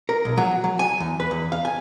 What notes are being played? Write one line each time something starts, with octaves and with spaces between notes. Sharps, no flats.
A#4
B1
F#3
F#3
G#5
E2
B4
E2
F5
G#5